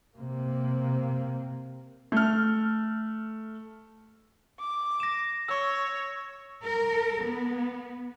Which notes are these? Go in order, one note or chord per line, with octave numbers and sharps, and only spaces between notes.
C3 A#3
A3 F6
D6
A#6 E7
C#5 C#6 E6
A#4
B3